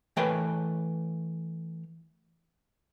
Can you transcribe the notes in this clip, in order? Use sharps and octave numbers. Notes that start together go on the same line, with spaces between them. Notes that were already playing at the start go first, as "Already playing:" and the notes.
E3 A3 A#4 B4 C#5 G5